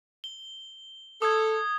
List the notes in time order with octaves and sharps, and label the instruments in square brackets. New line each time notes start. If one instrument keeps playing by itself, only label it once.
[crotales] G7
[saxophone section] A4 [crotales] D#6 G#6